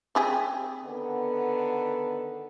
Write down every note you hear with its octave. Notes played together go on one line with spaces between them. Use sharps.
C4 G4 G#4
D3 D#3 B3